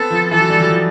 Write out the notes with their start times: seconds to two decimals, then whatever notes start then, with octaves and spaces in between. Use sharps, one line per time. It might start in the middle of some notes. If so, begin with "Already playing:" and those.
Already playing: B3 C4 A4
0.10 F3
0.31 E3 A4
0.41 F#3
0.50 G3
0.60 F#3
0.70 F3